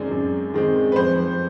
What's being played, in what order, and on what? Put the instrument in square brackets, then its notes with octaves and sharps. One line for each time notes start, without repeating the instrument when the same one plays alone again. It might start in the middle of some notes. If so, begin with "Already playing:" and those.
Already playing: [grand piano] F#2 D#3 G#3 C4 D5
F#2
D#3 G#3 C4
B4
F2 C5